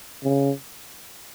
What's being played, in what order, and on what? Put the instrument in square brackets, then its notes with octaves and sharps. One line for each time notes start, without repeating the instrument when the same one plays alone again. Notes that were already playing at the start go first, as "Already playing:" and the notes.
[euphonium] C#3